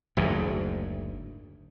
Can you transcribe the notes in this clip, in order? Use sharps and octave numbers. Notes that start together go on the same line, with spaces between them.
F#1 D2 G#2